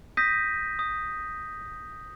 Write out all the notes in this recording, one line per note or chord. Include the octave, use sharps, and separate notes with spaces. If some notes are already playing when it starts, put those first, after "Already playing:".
D#6 G6 A#6 B6 D#7
D#6